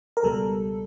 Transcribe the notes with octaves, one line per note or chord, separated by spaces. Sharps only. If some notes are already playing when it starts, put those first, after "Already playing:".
A#4
C#2 B2 G3 A4